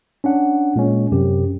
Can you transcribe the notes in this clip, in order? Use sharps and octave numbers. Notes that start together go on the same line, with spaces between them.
C#4 D4 F#5
A#2 G#3 C#4
F#2 C3 G4